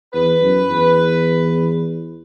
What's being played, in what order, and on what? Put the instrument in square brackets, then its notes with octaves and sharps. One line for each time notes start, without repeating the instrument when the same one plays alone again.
[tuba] E2 [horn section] B4
[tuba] F#2
E2